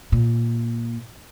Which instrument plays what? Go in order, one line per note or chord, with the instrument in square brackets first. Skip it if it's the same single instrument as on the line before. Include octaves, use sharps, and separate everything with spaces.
[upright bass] A#2